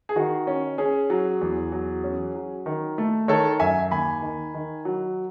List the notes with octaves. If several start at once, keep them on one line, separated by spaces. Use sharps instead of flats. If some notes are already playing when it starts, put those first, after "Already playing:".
G#4
D#3 F#4
C#4
C#4 G#4
F#3
E2
F#3
C#4
F#3
D#3
A3
D#3 A4 C#5
F#2 E5 G#5
D#2 G#5 B5
D#3
D#3
F#3